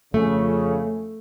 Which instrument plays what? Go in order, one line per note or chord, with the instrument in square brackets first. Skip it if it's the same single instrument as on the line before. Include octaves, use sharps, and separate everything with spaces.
[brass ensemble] F2 C#3 [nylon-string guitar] A3